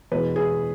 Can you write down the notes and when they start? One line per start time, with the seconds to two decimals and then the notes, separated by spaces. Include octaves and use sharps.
0.12 E2 B2 G#3 B4
0.36 G#4